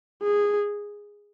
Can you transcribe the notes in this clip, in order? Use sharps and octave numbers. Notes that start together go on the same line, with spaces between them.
G#4